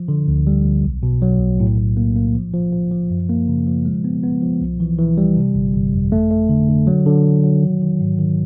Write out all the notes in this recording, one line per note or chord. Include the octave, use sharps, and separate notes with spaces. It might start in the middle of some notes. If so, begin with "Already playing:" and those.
Already playing: F3
D3
D2
G3
D2
B1
B2
F#3
B1
A2
A2
A#3
A#3
F3
F3
F3
F3
F#2
A#3
C#3
F3
G#3
B3
B3
F3
C2
E3
E3
G3
C3
G1
G1
F2
A3
A3
D3
D3
F#3
D3
F#3
F#3
D#3
D#3
G#2
D#3